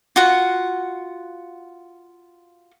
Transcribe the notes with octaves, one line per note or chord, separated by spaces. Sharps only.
F4 F#4 F#5